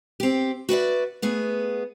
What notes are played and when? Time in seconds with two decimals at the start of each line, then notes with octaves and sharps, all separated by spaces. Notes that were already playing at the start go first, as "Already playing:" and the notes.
0.20 C4 G4
0.69 F#4 B4 D5 E5
1.22 A3 B3 G#4